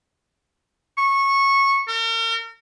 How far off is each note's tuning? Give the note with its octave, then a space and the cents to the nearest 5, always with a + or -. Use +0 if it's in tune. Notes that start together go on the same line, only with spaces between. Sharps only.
C#6 -15
A#4 -40